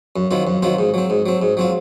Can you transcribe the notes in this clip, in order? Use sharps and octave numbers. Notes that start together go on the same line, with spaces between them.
F#2
D#3 F#3 C4 F4
F#2
D#3 F#3 C4 F4
G#2
F#3 C4
G#2
F#3 C4
G#2
F#3 C4 F4